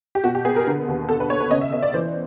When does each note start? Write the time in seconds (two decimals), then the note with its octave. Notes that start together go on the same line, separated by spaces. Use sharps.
0.15 G4
0.24 B2 F#4
0.35 G4
0.45 B3 G#4
0.56 A#4
0.67 D3
0.88 D#2
1.09 B2 A4
1.20 B4
1.30 B3 C#5
1.40 B4
1.51 C#3 D#5
1.61 E5
1.73 B3 D#5
1.82 D5
1.94 E3 C5